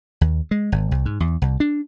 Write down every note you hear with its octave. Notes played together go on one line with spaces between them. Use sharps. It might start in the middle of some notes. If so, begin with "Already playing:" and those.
D#2
G#3
G#1
C2
G#2
E2
C2
D4